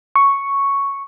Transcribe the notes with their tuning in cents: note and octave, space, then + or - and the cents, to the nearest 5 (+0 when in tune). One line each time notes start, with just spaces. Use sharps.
C#6 +0